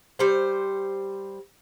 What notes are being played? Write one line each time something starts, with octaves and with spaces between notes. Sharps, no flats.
G3 C5